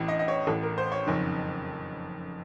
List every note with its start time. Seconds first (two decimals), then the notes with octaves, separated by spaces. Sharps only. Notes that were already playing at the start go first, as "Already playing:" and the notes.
Already playing: A1 A2
0.08 D#5
0.19 D#5
0.28 C#5
0.47 A1 A2 A4
0.63 A#4
0.78 C5
0.92 C#5
1.07 F#1 F2 D#3